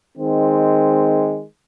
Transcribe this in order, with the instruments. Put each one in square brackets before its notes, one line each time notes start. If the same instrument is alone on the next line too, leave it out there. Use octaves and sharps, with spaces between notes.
[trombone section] D#3 G#3 C4